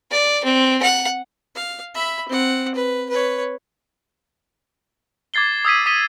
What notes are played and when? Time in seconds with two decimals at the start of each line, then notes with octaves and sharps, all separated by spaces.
0.11 D5
0.44 C4
0.83 F#5
1.55 F5
1.94 E5 B5
2.28 C4 F#5
2.75 B4
3.09 B4 C#5
5.34 D6 G#6 A6 C7 G7
5.65 D#6 E6 G#6 B6 D#7
5.86 D#6 B6 D#7 G7